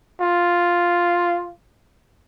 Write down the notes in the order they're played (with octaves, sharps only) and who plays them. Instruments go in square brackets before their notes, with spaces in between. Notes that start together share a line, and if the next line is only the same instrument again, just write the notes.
[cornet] F4